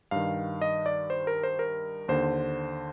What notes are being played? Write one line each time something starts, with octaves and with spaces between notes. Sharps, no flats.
G2 D#3 F5
D#5
D5
C5
A#4
C5
A#4
D#2 D3 C5